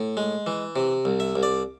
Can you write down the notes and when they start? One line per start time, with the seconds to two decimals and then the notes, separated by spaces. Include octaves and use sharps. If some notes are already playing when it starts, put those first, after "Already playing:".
Already playing: A2
0.17 G#3
0.47 E3
0.76 C3
1.05 C2
1.20 E5
1.36 C2
1.43 D5